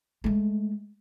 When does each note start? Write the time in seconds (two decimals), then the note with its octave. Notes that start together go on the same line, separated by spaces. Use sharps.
0.24 G#3 A3